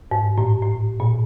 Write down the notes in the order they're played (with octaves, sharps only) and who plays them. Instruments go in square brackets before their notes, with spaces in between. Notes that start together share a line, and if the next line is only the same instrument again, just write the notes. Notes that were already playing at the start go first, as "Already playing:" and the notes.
[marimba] G#2
A2
A2
A#2